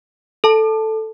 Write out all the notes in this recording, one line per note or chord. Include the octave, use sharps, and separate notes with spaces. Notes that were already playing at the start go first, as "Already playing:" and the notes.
A4 A5